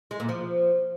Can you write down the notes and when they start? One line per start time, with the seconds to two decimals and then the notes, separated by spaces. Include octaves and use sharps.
0.11 G#3
0.20 A#2
0.29 F3